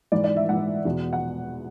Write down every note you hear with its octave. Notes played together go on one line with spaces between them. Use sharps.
G#2 E3 D5
D5
E5
G#2 E3 F#5
E2 B2
F#5